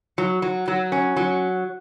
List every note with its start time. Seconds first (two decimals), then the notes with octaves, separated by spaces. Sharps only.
0.18 F#3
0.42 F#3
0.68 F#3
0.92 C#4
1.16 F#3